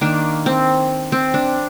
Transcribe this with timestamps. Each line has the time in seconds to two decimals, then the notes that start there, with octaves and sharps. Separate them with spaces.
0.01 D#3 A#3 D4
0.46 C4
1.12 C4
1.34 D4